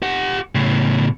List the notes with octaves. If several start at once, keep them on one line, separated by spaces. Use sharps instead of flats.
G4 F#5
A2 C#3